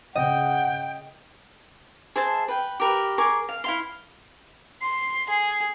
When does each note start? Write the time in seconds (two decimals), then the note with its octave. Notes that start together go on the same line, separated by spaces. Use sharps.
0.15 C#3 D#5 F#5 G5
2.16 G#4 C5 E5 A5
2.48 B4 G5
2.80 G4 A#4 B4
3.18 G#4 A#4 C#6 D6
3.49 F5
3.64 E4 F5 C6
4.82 C6
5.29 G#4